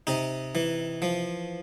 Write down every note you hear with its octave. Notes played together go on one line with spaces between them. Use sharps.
C3 D#4
E3
F3